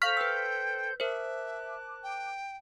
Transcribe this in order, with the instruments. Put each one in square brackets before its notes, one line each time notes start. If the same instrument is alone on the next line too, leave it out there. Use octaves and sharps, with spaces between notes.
[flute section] A4 C5 G6 [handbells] F5 C#6 [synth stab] F6 B6
[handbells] B4 E6 [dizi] G5
[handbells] A#4 C5 [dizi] E5 [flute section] A5 D6 F#6
[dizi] G5